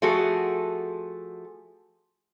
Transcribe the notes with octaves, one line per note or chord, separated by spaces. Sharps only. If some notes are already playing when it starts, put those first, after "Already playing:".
F3 A3 F#4 G#4 A4